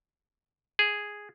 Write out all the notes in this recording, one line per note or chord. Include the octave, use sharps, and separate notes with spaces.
G#4